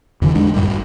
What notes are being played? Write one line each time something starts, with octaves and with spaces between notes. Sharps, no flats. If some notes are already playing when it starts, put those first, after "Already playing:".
E2 D3 E3
G#3 A3 D4
F#2 A2 G3
G#1